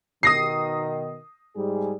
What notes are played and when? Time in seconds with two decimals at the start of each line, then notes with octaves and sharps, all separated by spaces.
0.23 B2 D#3 D#6 A#6 C7
1.56 G#2 G3 G#4